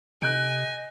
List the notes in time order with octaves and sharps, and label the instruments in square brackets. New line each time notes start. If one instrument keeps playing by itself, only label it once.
[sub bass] C3 [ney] D#5 [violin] G#5 [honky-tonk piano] F#6 G6 D7